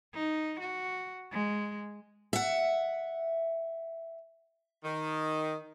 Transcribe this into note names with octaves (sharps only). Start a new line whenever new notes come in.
D#4
F#4
G#3
E5 F#5
D#3